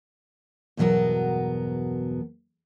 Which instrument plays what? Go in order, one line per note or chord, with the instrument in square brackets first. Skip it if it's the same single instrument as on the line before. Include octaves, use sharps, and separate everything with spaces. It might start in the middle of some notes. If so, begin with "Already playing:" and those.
[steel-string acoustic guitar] E2 G2 B2 F#3 B3 A#4